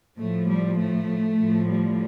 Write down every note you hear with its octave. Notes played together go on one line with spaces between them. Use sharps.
A2 F3 A3
G3
A3
A2 F3
G3